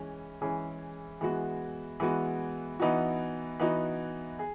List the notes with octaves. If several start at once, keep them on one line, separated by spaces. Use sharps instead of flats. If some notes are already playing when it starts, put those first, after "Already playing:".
Already playing: E3 G#3 C#4
E3 G#3 C#4 G#4
E3 G#3 B3 F#4
E3 G#3 B3 F#4
E3 B3 D#4 F#4
E3 B3 D#4 F#4
G#4